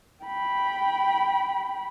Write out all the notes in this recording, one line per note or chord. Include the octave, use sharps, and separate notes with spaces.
G5 B5